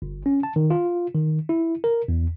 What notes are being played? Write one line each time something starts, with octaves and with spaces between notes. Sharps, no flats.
G1
C#4
A5
D#3
F4
D#3
E4
A#4
E2